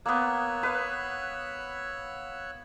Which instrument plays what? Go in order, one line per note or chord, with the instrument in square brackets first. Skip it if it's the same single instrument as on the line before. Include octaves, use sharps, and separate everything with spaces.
[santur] A#3 B3 [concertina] C#5 E6 F#6
[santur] B4 F5